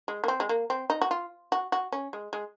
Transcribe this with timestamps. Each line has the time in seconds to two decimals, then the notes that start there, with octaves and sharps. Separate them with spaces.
0.08 G#3
0.24 A#3
0.28 C4
0.40 G#3
0.49 A#3
0.70 C4
0.90 D#4
1.01 F#4
1.11 F4
1.52 F#4
1.72 F#4
1.92 C#4
2.13 G#3
2.33 G#3